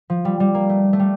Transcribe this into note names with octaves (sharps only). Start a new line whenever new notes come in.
F3
G3
G3
A#3
A3
A3
G3